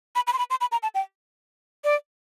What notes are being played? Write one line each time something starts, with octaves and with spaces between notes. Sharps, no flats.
B5
B5
C6
B5
C6
B5
A#5
A5
G5
D5